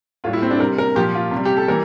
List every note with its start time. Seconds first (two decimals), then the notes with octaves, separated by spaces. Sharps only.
0.24 A2 G3 F4
0.33 E4
0.42 C4
0.51 D4
0.60 C3 G3 A#4
0.78 A#4
0.95 A#2 F3 G4
1.14 F4
1.31 C3
1.37 G3
1.45 G4
1.57 A4
1.68 E3 G3 A#4